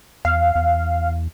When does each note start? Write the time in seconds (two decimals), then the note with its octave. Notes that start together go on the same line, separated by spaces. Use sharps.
0.25 E2 F5
0.55 E2